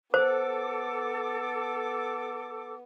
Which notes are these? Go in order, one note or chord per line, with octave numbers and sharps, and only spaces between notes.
B3 A4 C5 D6